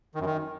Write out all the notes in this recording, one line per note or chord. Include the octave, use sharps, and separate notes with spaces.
D#3
F#2
D#3